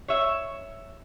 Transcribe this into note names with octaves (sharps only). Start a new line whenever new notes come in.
C#5 E5